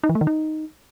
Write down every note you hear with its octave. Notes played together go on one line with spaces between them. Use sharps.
D#4
E3
A3
D#3
D#4